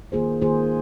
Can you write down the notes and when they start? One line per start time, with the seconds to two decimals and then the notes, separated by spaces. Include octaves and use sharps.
0.12 D#3 A#3 F4 G#4 C5
0.42 D#3 A#3 F4 G#4 C5